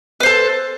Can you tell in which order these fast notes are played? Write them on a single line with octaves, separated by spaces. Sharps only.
B4 C5 A4